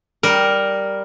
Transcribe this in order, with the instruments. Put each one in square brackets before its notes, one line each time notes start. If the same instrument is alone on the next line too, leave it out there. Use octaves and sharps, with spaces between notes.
[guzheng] G3 A#4